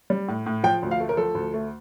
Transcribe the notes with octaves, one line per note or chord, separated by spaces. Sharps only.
G3
A2
A2
F3 G5
D2
F5
A3
A#4
F3 A4
D2
A3